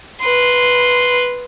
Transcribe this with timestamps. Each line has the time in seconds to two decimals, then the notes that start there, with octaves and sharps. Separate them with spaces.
0.21 B4 C6